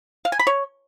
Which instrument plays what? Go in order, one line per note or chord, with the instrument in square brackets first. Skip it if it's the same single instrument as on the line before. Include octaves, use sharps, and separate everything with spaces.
[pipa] F5
G#5
B5
C#5